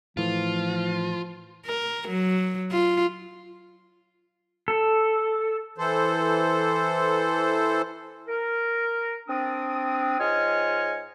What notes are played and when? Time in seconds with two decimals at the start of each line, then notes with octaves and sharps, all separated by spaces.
0.17 A2 E3 F3 F4
1.65 A#4
2.08 F#3
2.72 F4
4.68 A4
5.78 E3 A4 C5
8.28 A#4
9.28 C4 D4 D#6
10.19 G#2 F4 C#5 D#5 G#5 F6